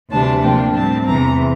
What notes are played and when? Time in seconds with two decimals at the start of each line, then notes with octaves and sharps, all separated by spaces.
0.11 D2 C3 E3 G3 D4 A5
0.42 C3 F3 A#3 D4 G5
0.74 A2 G3 C4 A5
1.07 E2 C3 E3 A#5